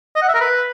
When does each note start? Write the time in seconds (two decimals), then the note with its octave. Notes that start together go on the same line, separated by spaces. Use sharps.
0.16 D#5
0.22 F#5
0.28 E5
0.35 A#4
0.41 B4